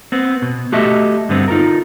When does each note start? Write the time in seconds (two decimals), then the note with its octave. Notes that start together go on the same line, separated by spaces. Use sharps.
0.12 B3 C4
0.42 B2
0.72 A3 F#4 G4 A4 D#5 E5
1.29 G2 D3 B3 C4
1.48 D#4 F4 A4 A#4